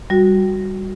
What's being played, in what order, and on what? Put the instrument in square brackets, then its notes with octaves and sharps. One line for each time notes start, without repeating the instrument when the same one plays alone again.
[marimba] G3 F#4